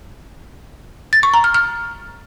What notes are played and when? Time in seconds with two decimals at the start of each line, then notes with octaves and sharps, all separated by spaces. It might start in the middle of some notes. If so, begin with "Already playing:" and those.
1.13 A6
1.23 C#6
1.34 A#5
1.44 F6
1.54 F6